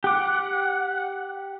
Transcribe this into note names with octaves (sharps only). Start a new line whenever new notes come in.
G4 F#5 D6